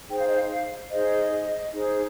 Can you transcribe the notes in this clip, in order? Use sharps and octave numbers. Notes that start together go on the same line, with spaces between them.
D#4 G#4 C5 G5
F5
D#5
F5
F5
D#4 G#4 C5 D#5
D#4 G#4 C5